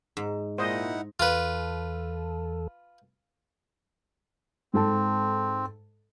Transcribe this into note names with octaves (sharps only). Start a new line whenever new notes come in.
G#2
A#2 G#3 D#4 E4 C5 D#5 F#5
E2 F4 A4 B4
G#2 C4 A4 A5